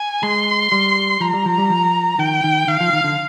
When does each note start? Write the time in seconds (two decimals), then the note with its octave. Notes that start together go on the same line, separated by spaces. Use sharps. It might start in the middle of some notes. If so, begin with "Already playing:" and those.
Already playing: G#5
0.23 G#3 C6
0.72 G3
1.20 F3 A#5
1.33 G3
1.46 F3
1.58 G3
1.70 F3
2.19 D#3 G5
2.44 D#3
2.68 D#3 F5
2.80 F3
2.93 D#3
3.04 D3